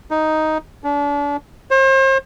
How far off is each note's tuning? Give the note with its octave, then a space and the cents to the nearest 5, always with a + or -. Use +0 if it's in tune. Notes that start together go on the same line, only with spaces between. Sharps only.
D#4 +5
D4 -35
C5 +40